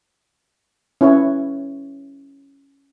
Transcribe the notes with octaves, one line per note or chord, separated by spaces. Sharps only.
C#4 E4 B4 C#5